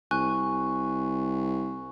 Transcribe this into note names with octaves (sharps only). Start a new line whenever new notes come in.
C2 G#5 C#6 F#6